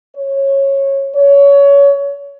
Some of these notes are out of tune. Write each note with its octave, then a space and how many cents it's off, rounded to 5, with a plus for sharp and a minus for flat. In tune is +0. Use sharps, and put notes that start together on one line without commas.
C#5 -15
C#5 +25